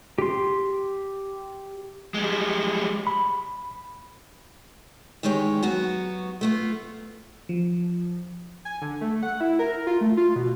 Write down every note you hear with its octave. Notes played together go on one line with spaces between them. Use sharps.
G4 C6
G3 G#3
B5
E2 D#3 G#3 G4 C#5
F#3 B3 F#4
A3 B3 F4
F3
G#5
D3
A3
F#5
E4
A#4
F4
A3
F4
B2